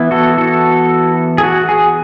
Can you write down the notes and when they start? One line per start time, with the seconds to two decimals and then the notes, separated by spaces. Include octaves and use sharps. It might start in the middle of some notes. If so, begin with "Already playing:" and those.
Already playing: E3 B3 E4
0.11 F#4 A4
0.37 F#4 A4
1.38 G#4
1.43 F#4
1.69 G#4